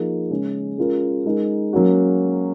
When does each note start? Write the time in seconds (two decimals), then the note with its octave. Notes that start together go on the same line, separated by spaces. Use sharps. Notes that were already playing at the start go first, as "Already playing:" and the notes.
Already playing: F3 A#3 D#4 G#4
0.30 C#3 G#3 C#4 G#4
0.78 G#3 C#4 F4 A#4
1.25 G#3 D#4 A#4
1.73 F#3 A#3 C#4 F#4